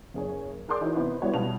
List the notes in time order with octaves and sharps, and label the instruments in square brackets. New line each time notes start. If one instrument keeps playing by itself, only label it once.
[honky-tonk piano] F#1 G#4 C#5
G#4 A#4 D5 C6 D6 G6
E3 D#4 F#4 C#5
C3 B3 D#4 E4
G3 B3 E4 F#4 C#5 D5
B2 G3 E4 F5 A5 F7